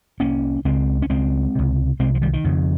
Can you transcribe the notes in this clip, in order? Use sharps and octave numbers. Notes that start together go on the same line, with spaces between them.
C2 C3 A#3 C#4
C#2 C#3 G#3 C4
C#4
C#2 C#3 G#3 C4
C#2 C3
C2 C3 G#3 C4
F3
D#3 G3
D#3
F2 C#3